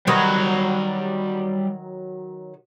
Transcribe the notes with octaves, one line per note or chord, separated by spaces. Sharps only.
D#3 F#3 G3 B4 A#5